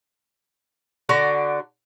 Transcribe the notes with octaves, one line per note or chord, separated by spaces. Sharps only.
D3 F#4 D5 A#5